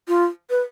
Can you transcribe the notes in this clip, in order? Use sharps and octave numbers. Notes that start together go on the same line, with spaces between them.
F4
B4